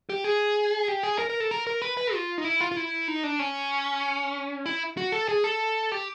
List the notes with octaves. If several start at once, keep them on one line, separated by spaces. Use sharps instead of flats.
G4
G#4
G4
G#4
A#4
A#4
A4
A#4
A#4
B4
B4
F4
D#4
E4
F4
F4
E4
D#4
D4
C#4
E4
F#4
A4
G#4
A4
G4